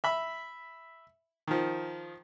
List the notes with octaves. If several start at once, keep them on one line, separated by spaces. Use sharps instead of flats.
E5 B5
D#3 F3